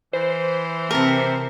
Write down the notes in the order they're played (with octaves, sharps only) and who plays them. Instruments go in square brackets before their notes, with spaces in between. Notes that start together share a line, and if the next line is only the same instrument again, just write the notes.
[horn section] E3 [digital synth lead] C5
[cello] C3 [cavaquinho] A#4 A5